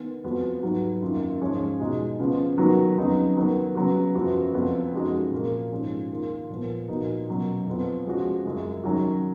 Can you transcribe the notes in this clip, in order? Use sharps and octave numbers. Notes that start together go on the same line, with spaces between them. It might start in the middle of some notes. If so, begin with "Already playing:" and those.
Already playing: D#3 B3
F2 F3 B3 F#4
G#2 F#3 B3 F#4
F#2 D#3 A#3 F4
G#2 F3 G#3 C#4 F4
B2 G#3 D#4 F#4
C#3 F3 B3 F4
D#3 F#3 B3 F#4
F2 C#3 F#3 B3 D#4
D#3 F#3 B3
C#3 F#3 B3 F#4
F#2 F3 B3 F#4
F2 F3 B3 F4
F#2 F3 G#3 D#4 F#4
A#2 F3 A#3
G#2 F3 G#3 C#4 F4
D#3 A#3 F4
A#2 F3 B3
A#2 F3 B3 D#4 F#4
B2 F#3 A#3 C#4
F2 F3 B3
F3 G#3 C#4 F#4
F#2 C#3 G#3
D#3 F#3 C#4 F#4